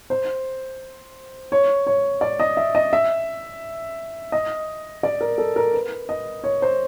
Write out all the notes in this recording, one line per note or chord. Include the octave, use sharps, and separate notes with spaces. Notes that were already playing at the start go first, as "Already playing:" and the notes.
C5
C#5
C#5
D5
D#5
E5
D#5
E5
D#5
D5
A#4
A4
A#4
B4
D#5
C#5
C5